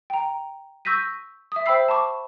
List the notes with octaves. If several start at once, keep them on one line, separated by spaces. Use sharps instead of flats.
G5 A#5
C#6 E6 G6 A#6 B6 D#7
E5 D#6
C5 E5 G5 B5 E6 C7
A5 B5 C#6 D6